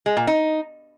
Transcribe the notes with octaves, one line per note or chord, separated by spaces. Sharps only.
G#3
A#2
D#4